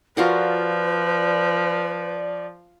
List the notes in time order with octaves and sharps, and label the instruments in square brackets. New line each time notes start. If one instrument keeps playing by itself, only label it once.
[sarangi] F3 [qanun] F4 F#4 A#4 [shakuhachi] B4 [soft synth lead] D5